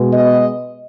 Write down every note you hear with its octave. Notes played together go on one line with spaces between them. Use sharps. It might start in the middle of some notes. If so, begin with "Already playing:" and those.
Already playing: B2 G#3 B3
D#5